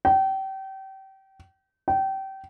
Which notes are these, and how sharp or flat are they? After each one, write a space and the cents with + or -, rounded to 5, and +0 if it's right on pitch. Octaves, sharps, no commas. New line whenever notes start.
G5 -30
G5 -25